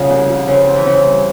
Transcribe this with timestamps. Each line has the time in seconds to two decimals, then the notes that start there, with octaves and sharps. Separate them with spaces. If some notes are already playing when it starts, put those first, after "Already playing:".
Already playing: C2 C#3 F3
0.10 C2
0.29 F3
0.47 C#3 C4
0.67 C4
0.76 E3
0.86 C#3 C4
1.05 G3